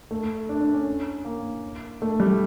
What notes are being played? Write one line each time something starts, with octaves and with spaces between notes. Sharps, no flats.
A3
D4
D4
C#4
A#3
A3
G3